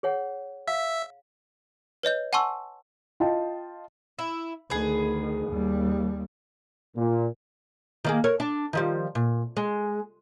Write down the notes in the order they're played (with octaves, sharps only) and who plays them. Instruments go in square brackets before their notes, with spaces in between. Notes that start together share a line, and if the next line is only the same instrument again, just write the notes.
[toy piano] G#4 C#5 F#5
[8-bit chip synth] E5 [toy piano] F5
[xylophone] B4 C#5 D#5 G6
F#5 G#5 A5 C6 C#6 E6
[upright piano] F4 D#5 G5 A5
[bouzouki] E4
[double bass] D2 D#3 [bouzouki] G#4 B4
[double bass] D#2 G3
[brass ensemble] A#2
[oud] D#3 A#3 G#4
A#4 C#5
D4
D#3 F3 G3
A#2
G#3